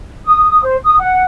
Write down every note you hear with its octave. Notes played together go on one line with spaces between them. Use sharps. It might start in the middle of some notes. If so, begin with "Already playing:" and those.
D#6
C5
D#6
F#5